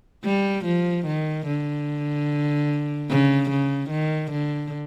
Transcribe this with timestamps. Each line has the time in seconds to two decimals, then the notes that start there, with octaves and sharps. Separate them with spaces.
0.25 G3
0.65 F3
1.06 D#3
1.47 D3
3.10 C#3
3.50 C#3
3.90 D#3
4.31 D3